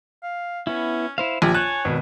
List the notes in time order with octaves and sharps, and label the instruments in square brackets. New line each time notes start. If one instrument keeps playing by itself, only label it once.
[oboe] F5
[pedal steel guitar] B3 E4 [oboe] C#4
[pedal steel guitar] E4 C5 F5
[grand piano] A#1 [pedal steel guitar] G4 [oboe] G#5
[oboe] C#5 [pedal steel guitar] G#5 A5 [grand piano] F#6
[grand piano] G#1 B2